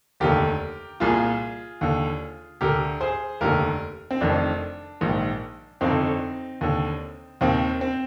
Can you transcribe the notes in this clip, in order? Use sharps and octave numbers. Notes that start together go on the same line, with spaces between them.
F1 D#2 D3 G4 A#4
C2 A#2 F4 G#4
D#2 D3
D2 D3 G4 A#4
G#4 C5
F1 D#2 D3 G4 A#4
C4
F1 F2 D#3 D4
A#1 G#2 D#3
G1 F2 D3 C4 D#4
D#2 D3
D#2 D#3 C4
C4